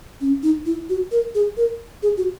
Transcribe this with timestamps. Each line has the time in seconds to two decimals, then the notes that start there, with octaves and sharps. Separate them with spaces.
0.21 C#4
0.43 D#4
0.66 E4
0.89 F#4
1.12 A#4
1.35 G#4
1.57 A#4
2.03 G#4
2.18 F#4